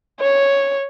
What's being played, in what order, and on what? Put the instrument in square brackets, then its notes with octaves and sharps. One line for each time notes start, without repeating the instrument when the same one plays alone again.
[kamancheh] C#5